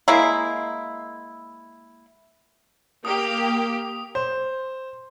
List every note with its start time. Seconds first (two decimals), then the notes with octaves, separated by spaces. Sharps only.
0.08 G#3 A#3 E4
3.05 A#3 G4 D#6
4.15 C5